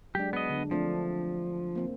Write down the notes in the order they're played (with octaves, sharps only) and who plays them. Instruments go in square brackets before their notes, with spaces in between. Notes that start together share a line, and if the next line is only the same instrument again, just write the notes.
[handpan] F#3 G#3 D4 [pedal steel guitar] G4
[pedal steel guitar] B3 D#5
[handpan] D3
[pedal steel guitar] F3 [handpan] A3 C4 D4
[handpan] A#3 C4